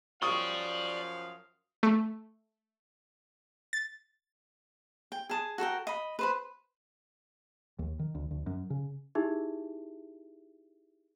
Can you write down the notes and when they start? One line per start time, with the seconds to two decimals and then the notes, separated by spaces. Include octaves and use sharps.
0.22 F#2 F3 D5 F5 G5 C#6 D#6
1.83 A3
3.73 A6
5.12 G5
5.29 G#4 A5 D#6
5.58 F#4 A4 A#4 G5
5.87 D#5 B5
6.19 B4 C5 B5
7.79 D#2
7.99 D#3
8.15 D2
8.31 D2
8.46 F#2
8.70 C#3
9.15 D#4 E4 G4 G#4 E5